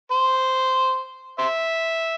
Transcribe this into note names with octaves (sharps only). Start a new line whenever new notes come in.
C5
C5 E5